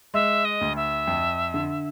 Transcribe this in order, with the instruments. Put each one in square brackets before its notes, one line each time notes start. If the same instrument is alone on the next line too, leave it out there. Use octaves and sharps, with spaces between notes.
[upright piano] G#3 [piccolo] E5
[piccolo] D#5
[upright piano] D2
[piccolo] E5
[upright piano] F2
D3